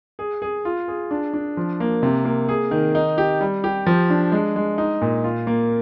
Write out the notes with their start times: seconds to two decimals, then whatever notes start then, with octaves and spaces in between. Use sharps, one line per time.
0.19 G#4
0.42 G#4
0.65 F4
0.88 G#4
1.11 D4
1.34 D4
1.57 F3
1.80 A#3
2.03 C3
2.25 A#3
2.49 G#4
2.71 D#3
2.95 D#4
3.18 G4
3.41 G3
3.64 G4
3.86 F3
4.10 D4
4.32 G#3
4.56 G#3
4.78 D#4
5.02 A#2
5.24 F4
5.47 A#3